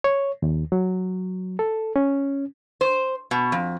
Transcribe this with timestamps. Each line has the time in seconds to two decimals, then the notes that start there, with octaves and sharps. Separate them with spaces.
0.04 C#5
0.42 D#2
0.72 F#3
1.59 A4
1.96 C#4
2.81 C5
3.31 B2
3.52 F2